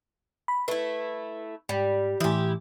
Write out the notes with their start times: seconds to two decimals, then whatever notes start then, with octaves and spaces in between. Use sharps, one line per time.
0.48 B5
0.68 A3 E4 B4
1.69 G#2 G3
2.20 A2 E3 E4 G4